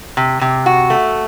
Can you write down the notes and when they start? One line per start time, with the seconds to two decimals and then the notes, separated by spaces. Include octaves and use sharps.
0.17 C3
0.41 C3
0.66 F#4
0.90 A3